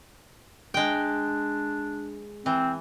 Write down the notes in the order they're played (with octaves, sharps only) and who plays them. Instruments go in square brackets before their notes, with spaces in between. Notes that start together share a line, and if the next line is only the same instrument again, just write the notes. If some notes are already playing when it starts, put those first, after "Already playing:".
[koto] G#3 G5 [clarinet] D4
[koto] E3 [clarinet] C4